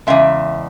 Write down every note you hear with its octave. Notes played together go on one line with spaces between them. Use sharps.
E2 C#3 G#3 E5